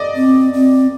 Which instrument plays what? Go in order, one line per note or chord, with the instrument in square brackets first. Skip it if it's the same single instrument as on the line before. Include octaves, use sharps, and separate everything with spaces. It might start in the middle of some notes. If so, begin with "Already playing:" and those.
Already playing: [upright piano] D5 D#5
[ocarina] C4
C4